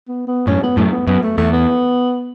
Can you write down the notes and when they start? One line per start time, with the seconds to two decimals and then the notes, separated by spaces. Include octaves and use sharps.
0.08 B3
0.27 B3
0.47 F#2 A2 C#4
0.63 B3
0.77 F#2 A2 A3
0.92 B3
1.07 F#2 B3
1.23 A3
1.37 E2 A3
1.53 B3